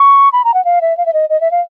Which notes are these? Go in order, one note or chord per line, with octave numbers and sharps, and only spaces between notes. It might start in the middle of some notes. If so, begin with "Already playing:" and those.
Already playing: C#6
B5
A#5
F#5
F5
E5
F5
E5
D#5
D#5
E5
F5